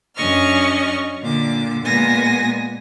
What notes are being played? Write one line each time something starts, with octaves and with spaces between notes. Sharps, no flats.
F#2 C#4 D4 D#5 C#6 F6
A#2 D3 D6
A#2 G#3 B3 G#5 D#6 A#6